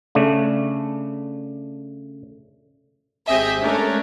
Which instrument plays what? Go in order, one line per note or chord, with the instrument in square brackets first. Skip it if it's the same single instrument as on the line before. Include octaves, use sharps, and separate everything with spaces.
[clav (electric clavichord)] C#3 A3 D4
[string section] G#1 C4 G4 G#4 D#5 E5
G#3 A3 C#4 D4 A#4 C#5